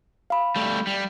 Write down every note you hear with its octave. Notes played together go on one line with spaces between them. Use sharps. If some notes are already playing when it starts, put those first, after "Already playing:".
F5 B5
G3 A3
G3